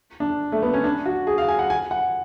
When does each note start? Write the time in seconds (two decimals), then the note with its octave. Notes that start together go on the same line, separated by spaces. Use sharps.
0.20 D4
0.52 A3
0.63 B3
0.74 C#4
0.84 D4
1.06 F#4
1.27 G#4
1.38 F5
1.48 G#5
1.59 F#5
1.70 G#5
1.91 F#5